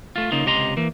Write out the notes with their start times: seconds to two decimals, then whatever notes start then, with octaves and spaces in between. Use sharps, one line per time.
0.16 A3 F4
0.32 C#3 A#3 D#4 F4
0.46 C#2 C3 G4 D#5 A#5 C6
0.77 E3 A#3